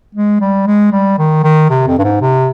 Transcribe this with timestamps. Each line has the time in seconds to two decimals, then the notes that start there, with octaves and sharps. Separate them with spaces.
0.15 G#3
0.41 G3
0.67 G#3
0.92 G3
1.19 D#3
1.44 D#3
1.70 C3
1.87 F2
1.98 G2
2.04 G#2
2.21 C3